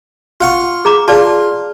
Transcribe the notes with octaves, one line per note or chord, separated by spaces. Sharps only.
F4 F#5 C#6
G#4 A#5 D6
F4 G#4 D5 A5